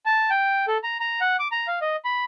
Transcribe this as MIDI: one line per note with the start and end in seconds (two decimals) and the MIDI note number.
0.06 0.30 81
0.30 0.65 79
0.68 0.78 69
0.83 0.97 82
1.00 1.20 82
1.21 1.36 78
1.39 1.48 86
1.52 1.67 82
1.67 1.79 77
1.82 1.96 75
2.05 2.25 83